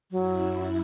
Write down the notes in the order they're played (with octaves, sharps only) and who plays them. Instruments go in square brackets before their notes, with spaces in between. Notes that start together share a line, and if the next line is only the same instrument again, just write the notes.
[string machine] F#2 E4 [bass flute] F#3